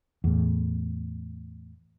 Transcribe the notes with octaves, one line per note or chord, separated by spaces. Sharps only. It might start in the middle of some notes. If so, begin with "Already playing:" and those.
E2 A2